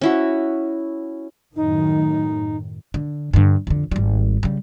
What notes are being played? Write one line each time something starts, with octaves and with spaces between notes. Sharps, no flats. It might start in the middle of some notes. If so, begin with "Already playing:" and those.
C#4 E4 F#4
F#2 A2 D#3 D#4
D3
G2 D3
F2 D3
G#1 G3
C#3 G3